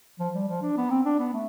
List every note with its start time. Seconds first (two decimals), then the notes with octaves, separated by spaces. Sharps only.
0.19 F3
0.35 G3
0.48 F3
0.62 D4
0.77 B3
0.90 C4
1.06 D4
1.19 B3
1.33 A3